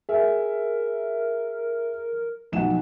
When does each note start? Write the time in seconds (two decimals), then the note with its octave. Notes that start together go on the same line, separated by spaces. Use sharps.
0.09 G#4 A#4 E5
2.52 B1 F3 F#5 E7